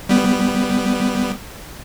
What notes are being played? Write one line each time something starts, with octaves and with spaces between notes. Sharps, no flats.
G3 B3